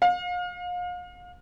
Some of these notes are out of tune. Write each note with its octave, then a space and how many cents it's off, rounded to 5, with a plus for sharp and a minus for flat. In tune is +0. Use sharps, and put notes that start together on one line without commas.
F5 +35